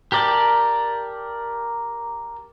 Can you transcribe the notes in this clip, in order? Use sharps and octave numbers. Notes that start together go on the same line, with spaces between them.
G4 A#4 D5 A5